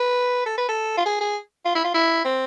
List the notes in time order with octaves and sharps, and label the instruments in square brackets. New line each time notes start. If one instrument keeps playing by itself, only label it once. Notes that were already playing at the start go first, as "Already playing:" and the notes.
Already playing: [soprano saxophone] B4
A4
B4
A4
F4
G#4
G#4
F4
E4
F4
E4
C4